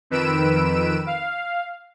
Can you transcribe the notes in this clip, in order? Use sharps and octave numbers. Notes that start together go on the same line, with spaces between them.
F2 D#3 B4 E6 D7 E7
F5